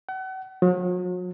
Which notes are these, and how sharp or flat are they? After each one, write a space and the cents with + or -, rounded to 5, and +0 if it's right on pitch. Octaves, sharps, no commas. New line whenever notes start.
F#5 +35
F#3 -40